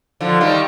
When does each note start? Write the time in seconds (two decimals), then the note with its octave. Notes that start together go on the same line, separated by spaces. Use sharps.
0.21 D3 F3
0.41 D#3 G3